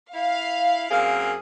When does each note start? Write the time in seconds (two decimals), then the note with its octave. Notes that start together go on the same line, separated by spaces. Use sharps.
0.14 E4 F5
0.91 F#2 A#3 C4 G#4